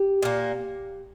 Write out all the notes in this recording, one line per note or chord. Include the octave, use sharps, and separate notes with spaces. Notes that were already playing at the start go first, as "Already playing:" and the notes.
Already playing: G4
A#2 A#3